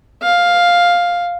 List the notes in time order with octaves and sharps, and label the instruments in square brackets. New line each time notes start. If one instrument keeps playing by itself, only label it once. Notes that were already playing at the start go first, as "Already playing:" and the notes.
[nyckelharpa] F5